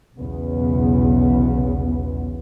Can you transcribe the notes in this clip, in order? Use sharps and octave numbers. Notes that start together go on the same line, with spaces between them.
B1 E2 C#3 B3